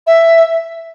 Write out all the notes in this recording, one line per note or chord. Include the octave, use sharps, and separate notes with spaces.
E5